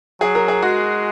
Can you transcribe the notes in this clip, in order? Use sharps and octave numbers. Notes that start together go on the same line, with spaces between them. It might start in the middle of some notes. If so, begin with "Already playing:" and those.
F#3 G#4
A#4
G#4
G#3 F#4